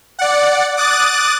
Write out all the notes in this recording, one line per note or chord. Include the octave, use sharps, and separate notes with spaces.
D5 F#5
D6 D#6 F#6 A6